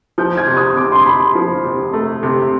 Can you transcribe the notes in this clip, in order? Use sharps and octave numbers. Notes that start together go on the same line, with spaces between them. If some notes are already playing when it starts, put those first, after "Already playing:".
F3 G6
G#6
C3
D#6
C3 D6
C6
C3 B5
B5
F3
C3
A3
C3